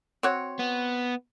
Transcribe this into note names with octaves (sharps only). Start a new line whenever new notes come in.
C4 F#4 C#5
B3